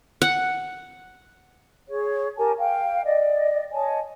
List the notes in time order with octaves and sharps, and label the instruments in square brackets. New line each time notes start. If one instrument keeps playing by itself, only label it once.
[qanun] F#5
[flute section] G#4 C#5
G4 A#4 G#5 A5
F5 G5
D5 D#5
C#5 D#5 G#5 A5